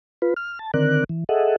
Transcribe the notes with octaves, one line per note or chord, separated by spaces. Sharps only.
F4 B4
F6
A5
D3 D#3 C4 A#4 D5 F#6
E3
G#4 A4 D#5 E5 F#5